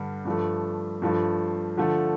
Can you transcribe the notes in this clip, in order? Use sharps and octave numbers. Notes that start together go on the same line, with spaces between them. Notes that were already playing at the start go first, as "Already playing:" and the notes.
Already playing: G2 D3 G3
G2 F3 A3
G2 F3 A3
D3 F3 A3